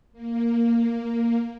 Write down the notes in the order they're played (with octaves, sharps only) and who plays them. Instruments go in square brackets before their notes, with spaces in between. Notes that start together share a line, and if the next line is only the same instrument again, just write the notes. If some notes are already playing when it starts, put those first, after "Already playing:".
[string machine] A#3